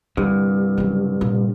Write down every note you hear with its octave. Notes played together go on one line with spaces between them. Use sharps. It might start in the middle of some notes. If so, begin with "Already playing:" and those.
C2 G2 D3
C#3 F#3
A#2 C#3